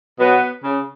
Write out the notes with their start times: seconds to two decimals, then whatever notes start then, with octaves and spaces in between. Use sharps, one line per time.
0.20 B2 F#3 B3
0.64 C#3